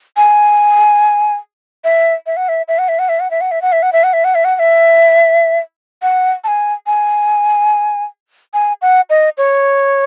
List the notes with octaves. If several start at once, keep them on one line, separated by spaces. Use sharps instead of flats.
G#5
E5
E5
F#5
E5
E5
F#5
E5
F#5
E5
F#5
E5
F#5
E5
F#5
E5
F#5
E5
F#5
E5
F#5
E5
F#5
F#5
E5
F#5
A5
G#5
G#5
G#5
F#5
D#5
C#5